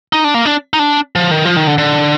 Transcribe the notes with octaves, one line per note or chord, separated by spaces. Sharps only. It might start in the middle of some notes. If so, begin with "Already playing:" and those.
D#4
D4
A#3
D4
D#4
D4
F3
D#3
F3
D#3
D3
D3